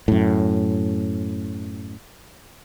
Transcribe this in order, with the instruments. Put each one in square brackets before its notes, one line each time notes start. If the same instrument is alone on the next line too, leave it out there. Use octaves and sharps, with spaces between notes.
[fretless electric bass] F#2 A2